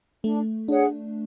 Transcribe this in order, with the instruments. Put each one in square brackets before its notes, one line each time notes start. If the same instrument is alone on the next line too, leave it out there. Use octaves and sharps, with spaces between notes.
[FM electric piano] A3 [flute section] D4
[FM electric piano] D4 [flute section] G#4 C#5 F#5